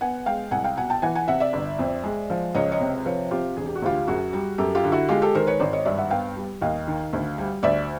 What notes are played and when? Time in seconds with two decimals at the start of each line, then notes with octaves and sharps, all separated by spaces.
0.01 B3 F#5 G#5
0.26 G#3 F5 G5
0.51 C2 F#5 G#5
0.64 F5 G5
0.77 B2 F#5 G#5
0.90 G5 A5
1.02 E3 F#5 G#5
1.15 F#5 G#5
1.28 C3 E5 F#5
1.40 D5 E5
1.53 G1
1.79 F2
2.04 G#3
2.30 F3
2.55 C#2 C#5 D#5
2.71 C#5 D#5
2.80 C3
3.06 F3 B4 C#5
3.31 C3 F4 G4
3.56 E1 G#4
3.66 G4
3.76 F#4
3.82 D2 F4 G4
4.07 F#2 F#4 G#4
4.33 G3
4.58 F#2 G4 A4
4.75 F4 G4
4.84 D3
4.92 E4 F#4
5.09 G#3 F4 G4
5.22 G4 A4
5.35 D#3 A#4 C5
5.47 B4 C#5
5.60 G#1 C5 D5
5.73 C#5 D#5
5.85 G2 D5 E5
5.98 E5 F#5
6.10 B3 F5 G5
6.36 G3
6.61 D#2 D#5 F5
6.87 D#3
7.13 D2
7.38 G3
7.63 D2 D5 E5